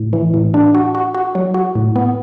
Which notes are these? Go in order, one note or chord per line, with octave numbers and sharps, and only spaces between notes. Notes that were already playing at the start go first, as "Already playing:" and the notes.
Already playing: A2
E3
A2
D4
F#4
F#4
F#4
F#3
F#4
A2
B3